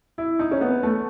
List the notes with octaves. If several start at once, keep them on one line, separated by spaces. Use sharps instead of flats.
E4
D#4
C#4
B3
A3